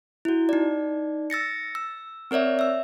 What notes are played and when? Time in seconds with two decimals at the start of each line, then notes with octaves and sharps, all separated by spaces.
0.25 E4 F#4
0.49 D#4 D5
1.30 E6 A6 A#6 C#7
1.75 E6
2.31 C4 A#4 C#5 D5 E5
2.59 E5 E6